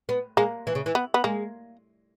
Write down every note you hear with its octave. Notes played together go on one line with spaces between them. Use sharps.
B3
G#3 A#3
E3
C#3
E3
B3
B3
G#3 A#3